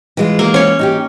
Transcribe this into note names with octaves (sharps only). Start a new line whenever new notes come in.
E3 G#3 F4
A#3
C#4 C#5
D#4 F#4 G4